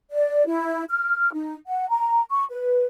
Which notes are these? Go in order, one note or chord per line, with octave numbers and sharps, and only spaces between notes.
D5
E4
F6
D#4
F#5
A#5
C#6
B4